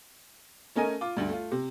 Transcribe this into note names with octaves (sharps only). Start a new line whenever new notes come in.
A3 C#4 A#4 D#5 G#5 D#7
F4 D6
D2 G2
A3 F4
C3